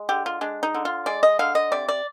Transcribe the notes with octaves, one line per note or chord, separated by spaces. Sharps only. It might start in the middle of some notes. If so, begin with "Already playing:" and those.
Already playing: G#3
D3 G4
F4
G#3 D4
D#4
D3
F4
G#3 D5
D#5
D3 F5
D#5
C3 D5
D5